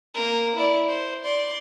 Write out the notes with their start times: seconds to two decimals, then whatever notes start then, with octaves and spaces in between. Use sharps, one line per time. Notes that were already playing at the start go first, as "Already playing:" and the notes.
0.15 A#3 A#4
0.55 E4 D5
0.88 C5
1.24 D5 C6